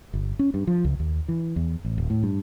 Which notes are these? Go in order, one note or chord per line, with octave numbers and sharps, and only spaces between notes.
G1
C#4
G2
F3
C#2
D#2
E3
E2
A1
D#1
A2
G2